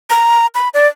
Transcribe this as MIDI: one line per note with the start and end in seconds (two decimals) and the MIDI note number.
0.10 0.46 82
0.55 0.69 83
0.74 0.87 74